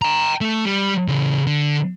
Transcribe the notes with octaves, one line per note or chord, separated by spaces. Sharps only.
G5 A#5
A3
G3
C#3 E3
D3